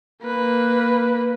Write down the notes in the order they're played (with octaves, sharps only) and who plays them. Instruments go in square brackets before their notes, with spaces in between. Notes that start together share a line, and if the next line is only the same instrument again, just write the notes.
[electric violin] A#3 B4